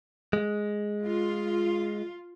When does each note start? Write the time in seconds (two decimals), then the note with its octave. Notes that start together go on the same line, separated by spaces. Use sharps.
0.33 G#3
1.03 F4